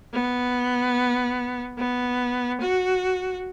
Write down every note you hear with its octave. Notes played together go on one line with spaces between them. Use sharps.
B3
B3
F#4